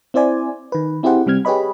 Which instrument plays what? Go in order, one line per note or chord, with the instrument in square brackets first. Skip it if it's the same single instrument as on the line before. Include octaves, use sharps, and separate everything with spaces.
[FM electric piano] C4 E4 C5 D5 G#5
D#3 B4
C4 E4 G4 G#4 C5 F#5
C3 G3 C4 F6 G#6
G4 G#4 B4 C#5 D#5 B5